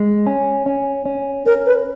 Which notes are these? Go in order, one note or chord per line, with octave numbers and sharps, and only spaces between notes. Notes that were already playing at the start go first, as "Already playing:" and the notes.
Already playing: G#3
C#4
C#4
C#4
C#4 A#4
B4